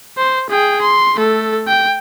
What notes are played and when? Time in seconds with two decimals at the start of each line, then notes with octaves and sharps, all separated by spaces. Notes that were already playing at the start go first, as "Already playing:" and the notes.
0.18 C5
0.50 G#4 G5
0.81 C6
1.15 A3 A4
1.68 G5